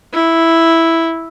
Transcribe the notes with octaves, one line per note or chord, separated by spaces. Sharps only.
E4